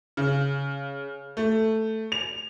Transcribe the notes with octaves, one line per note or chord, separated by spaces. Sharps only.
C#3
A3
F7